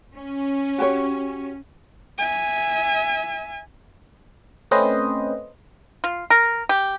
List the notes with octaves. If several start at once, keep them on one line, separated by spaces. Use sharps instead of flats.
C#4
F#4 G4 C#5
E5 G#5
A3 C4 C#4 B4 C5 D#5
F4
A#4
G4